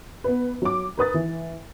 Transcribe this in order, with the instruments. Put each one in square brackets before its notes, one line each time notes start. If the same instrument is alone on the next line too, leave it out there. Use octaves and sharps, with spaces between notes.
[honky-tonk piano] B3 B4
F#3 D6
A#4 B4 D#6 A6
E3